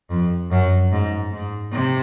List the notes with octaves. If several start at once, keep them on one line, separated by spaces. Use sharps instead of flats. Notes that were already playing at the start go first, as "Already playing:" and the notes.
F2
F#2
G#2
G#2
C3